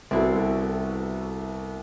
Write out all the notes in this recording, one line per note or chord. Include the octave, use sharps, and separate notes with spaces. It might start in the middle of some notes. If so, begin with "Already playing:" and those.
C2 B3 C4 E4 F#4 A4